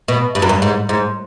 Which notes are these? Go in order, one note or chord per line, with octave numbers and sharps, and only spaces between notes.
B2
G2
F#2
G2
G#2
G#2